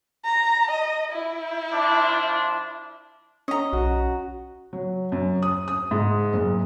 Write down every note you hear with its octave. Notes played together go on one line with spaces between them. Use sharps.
A#5
D#5
E4
F3 D4
C#4 D#5 A#5
B1 F#4
F#3
F#2
D#6
D#6
G#2
F#1